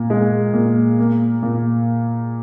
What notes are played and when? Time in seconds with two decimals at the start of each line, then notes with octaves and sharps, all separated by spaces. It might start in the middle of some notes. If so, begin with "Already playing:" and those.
Already playing: A#2
0.10 G#3
0.53 A#2
0.99 A#3
1.43 A#2